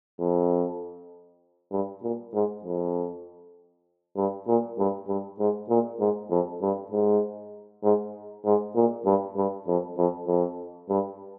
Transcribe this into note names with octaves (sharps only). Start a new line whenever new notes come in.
F2
G2
A#2
G#2
F2
G2
A#2
G2
G2
G#2
A#2
G#2
F2
G2
G#2
G#2
G#2
A#2
G2
G2
F2
F2
F2
G2